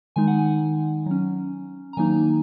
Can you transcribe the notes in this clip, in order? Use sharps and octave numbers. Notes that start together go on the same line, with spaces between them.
D#3 G#3 D#4 G#5
F#5
G#5
F#3 C#4
A#5
D#3 F#3 A#3 D#4 G#5